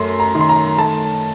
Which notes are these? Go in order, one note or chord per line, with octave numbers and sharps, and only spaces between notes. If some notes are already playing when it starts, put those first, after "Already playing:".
Already playing: F#2 A3 C6
A#5
D#3
C6
A#5
A3 A5